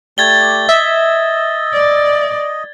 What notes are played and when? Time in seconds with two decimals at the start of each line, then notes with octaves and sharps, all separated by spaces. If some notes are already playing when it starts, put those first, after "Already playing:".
0.18 A3 G4 D5 G#6 A6 G7
0.69 D#5 E5
1.73 D5